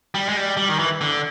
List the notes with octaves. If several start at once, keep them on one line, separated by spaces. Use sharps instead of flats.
G3
G#3
G3
G3
D#3
E3
D3